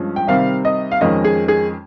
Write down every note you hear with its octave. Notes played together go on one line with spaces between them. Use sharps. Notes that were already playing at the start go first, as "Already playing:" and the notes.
Already playing: G2 F3 G#3 C#4
G5
C3 D#3 G3 C4 F5
D#5
F5
F2 D#3 G#3 C#4 D#5
G#4
G#4